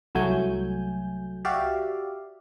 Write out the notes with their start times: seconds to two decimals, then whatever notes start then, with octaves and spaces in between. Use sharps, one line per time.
0.15 C2 F#3 A3 G#5 G6
1.45 F#4 G4 D5 E5 F5